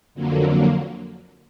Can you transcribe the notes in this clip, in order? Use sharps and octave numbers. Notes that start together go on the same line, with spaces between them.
F2 D3 F#3 A#3